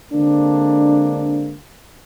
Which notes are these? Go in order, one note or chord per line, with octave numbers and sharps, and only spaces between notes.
D3 G#3 A#3 C4 D4